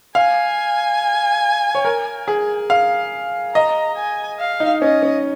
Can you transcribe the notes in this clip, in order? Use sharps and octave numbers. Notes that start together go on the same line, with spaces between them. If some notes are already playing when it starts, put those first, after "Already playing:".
F5 G#5
C#5
A#4
G#4
F5
D#5 A#5
G#5
F5
D#4
C#4 D#5
C#4